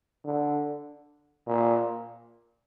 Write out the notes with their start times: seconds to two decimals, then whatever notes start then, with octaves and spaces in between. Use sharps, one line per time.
0.25 D3
1.47 A#2